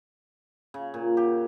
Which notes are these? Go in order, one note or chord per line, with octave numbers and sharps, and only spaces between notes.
C#3
A#2
G4